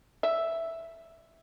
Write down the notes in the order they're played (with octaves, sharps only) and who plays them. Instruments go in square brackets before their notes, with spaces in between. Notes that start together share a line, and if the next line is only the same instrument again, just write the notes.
[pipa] E5